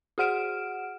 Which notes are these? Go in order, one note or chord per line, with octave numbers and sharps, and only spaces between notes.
F#4 G#4 F#5 F6 D7 E7